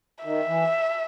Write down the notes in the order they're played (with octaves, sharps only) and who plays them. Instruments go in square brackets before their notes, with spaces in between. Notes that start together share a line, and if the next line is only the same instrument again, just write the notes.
[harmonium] D#3 [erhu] E5
[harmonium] E3